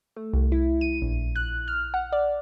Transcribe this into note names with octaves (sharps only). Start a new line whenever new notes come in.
A3
C2
E4
D#7
A#1
F#6
F6
F#5
D5